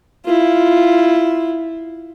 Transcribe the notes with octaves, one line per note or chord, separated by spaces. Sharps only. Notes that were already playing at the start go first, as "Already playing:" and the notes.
E4 F4